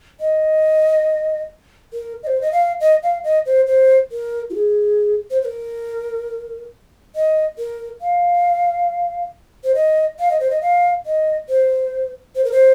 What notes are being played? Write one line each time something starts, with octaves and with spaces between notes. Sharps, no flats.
D#5
A#4
D#5
C5
D#5
F5
D#5
F5
D#5
C5
C5
A#4
F4
G#4
C5
C5
A#4
D#5
A#4
F5
C5
D#5
F5
D#5
C5
D#5
F5
D#5
C5
C5
A#4
C5